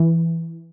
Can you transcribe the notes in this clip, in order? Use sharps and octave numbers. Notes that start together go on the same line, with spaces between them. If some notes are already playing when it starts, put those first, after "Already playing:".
Already playing: E3